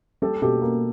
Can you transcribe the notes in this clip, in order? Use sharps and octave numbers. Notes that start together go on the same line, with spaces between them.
G3 G4 A4
B2 G4 A4
A#3